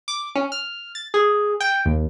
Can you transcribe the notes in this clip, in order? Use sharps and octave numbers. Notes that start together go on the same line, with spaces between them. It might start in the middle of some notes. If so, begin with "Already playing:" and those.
D6
C#4
F6
A6
G#4
G5
D#2